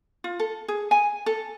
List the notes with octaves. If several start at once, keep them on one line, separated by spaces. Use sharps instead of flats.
F4
A4
G#4
G#5
A4